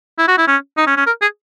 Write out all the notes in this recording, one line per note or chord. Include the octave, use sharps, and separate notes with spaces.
E4
F#4
E4
C#4
D#4
C#4
C#4
A#4
G#4